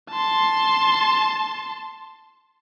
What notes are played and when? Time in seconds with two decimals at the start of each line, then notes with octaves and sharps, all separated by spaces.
0.11 A5 C6